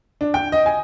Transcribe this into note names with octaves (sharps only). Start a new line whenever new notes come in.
D4
G5
D#5
G#5